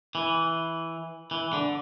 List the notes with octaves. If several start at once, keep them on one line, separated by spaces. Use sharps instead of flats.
E3
E3
D3